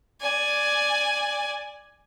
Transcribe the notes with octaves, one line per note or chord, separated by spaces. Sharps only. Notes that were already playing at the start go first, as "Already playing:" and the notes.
D5 G#5